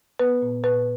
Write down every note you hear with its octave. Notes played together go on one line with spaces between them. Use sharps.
B3 B4
A#2
A#2 B4